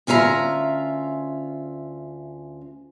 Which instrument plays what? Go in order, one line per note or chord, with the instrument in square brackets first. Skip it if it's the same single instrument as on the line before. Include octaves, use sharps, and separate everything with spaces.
[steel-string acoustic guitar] D2 C#4 F4 E5 A#5